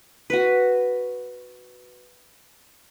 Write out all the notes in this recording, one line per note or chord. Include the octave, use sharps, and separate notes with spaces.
F#4 B4